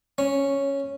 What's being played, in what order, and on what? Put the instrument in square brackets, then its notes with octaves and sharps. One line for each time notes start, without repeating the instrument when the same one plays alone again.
[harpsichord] C#4